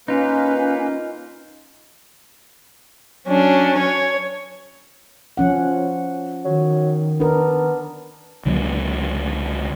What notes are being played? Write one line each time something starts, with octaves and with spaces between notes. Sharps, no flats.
A#3 C#4 D#4 F4 B4
F#3 C#4 D4
C#5
F3 C#4 F#5
D#3 F#3
B3 D4 A#4
C#2 D3 F#3 A#3